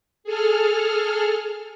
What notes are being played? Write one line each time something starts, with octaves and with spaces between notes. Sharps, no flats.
G#4 A4 F6